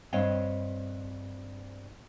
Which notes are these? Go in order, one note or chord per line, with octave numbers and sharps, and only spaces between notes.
G2 C4 C#5 D#5 F5 G5